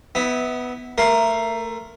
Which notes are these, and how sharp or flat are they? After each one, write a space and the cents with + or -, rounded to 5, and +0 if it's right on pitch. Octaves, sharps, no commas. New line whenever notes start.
B3 +10 E4 -25
A3 +25 A#4 +0 C6 +10